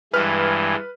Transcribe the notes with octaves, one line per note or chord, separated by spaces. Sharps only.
G2 E3 G#3 B4 F6